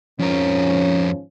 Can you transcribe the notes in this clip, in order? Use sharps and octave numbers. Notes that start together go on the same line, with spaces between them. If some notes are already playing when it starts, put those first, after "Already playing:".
F2 G#2 F3 C#4 A#4